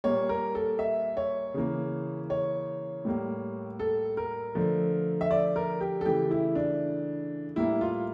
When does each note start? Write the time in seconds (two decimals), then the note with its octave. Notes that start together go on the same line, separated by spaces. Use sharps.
0.04 A#2 G3 A#3 C#5
0.29 A#4
0.55 A4
0.79 E5
1.17 C#5
1.54 C#3 E3 A#3
2.30 C#5
3.05 A2 G3 A#3
3.79 A4
4.17 A#4
4.55 D3 F3 A3
5.21 E5
5.31 D5
5.56 A#4
5.80 G4
6.01 A4
6.05 C#3 E3 A3 G4
6.31 E4
6.55 D4
7.56 A2 G3 A#3 E4
7.81 F4